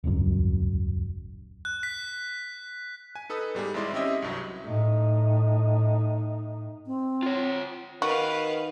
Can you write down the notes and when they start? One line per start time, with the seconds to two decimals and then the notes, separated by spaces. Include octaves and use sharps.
0.04 D#1 G#1 C#2 F#2
1.65 F#6
1.83 B6
3.15 G#5
3.29 D#4 A4 B4 D#6
3.55 G#2 G3 B3 G#4
3.74 G#1 G#3 E4 D5 C6
3.93 C4 C#4 E4 G4 D#5 E5
4.22 C2 G2 F#3
4.64 A2 D#4
6.86 C4
7.23 F4 C#5
8.02 D#3 F#4 B4 F5